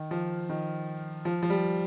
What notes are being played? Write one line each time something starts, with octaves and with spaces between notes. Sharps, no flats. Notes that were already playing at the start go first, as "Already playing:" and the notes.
Already playing: D#3
F3
D#3
F3
F3
G3